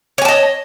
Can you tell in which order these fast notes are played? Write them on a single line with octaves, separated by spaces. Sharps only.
C#5 G#5 A5 D#5